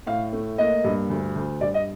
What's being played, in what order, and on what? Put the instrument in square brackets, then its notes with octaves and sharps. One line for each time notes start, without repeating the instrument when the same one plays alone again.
[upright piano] A2 F5
A3
A#3 D#5
G2
D2
D2
G2 D5
D#5